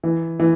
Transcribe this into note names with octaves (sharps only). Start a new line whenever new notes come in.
E3
E3